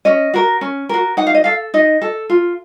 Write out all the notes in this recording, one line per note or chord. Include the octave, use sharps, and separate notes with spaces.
C#4 D#5
F#4 A#4
C#4
F#4 A#4
D#4 F#5
F5
D#5
A4 F5
D#4 D#5
A4
F4